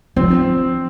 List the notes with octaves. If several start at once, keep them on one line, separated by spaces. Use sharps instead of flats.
F3 C4